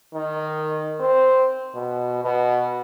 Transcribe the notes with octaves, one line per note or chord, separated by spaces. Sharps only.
D#3
C4
B2
B2